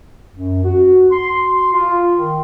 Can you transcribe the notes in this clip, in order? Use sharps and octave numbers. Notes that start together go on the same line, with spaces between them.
F#2
F#4
C6
F4
D#3